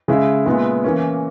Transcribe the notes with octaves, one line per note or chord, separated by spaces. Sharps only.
C#3 G#3 C#4 E4 G#4
A#2 G#3 B3 E4
E3 A#3 C#4